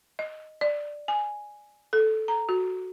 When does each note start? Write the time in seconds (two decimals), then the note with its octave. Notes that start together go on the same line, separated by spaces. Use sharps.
0.19 D#5
0.61 D5
1.08 G#5
1.93 A4
2.28 A#5
2.49 F#4